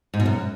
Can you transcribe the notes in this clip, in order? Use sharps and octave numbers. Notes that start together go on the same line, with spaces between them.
G#2
B2
F#2